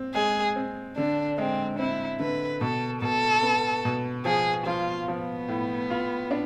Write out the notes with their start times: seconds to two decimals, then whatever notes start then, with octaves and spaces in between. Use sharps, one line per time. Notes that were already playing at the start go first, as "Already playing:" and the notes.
Already playing: C4
0.15 G#3 G#4
0.56 C4
0.97 D3 D4
1.38 G#3 C4
1.79 C4 E4
2.19 D3 B4
2.61 B2 A4
3.02 B2 A4
3.43 B3
3.85 B2
4.25 F3 G#4
4.66 F3 F4
5.08 F3 B3
5.48 A2
5.90 F4
6.31 D4